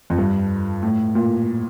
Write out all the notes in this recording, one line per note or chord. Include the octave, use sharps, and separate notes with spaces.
F2
G2
A2
A#2